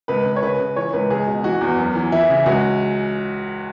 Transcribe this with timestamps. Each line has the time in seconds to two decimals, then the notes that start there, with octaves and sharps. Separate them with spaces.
0.08 C#2 B4
0.25 C#2
0.36 C#5
0.43 C#3 B4
0.59 C#3
0.76 E3 C#5
0.93 C#2 B4
1.10 C#2 G#4
1.27 B2
1.44 E3 F#4
1.61 E2
1.78 F#2
1.95 E3
2.12 E3 E4
2.29 C#3
2.46 C#2 F#4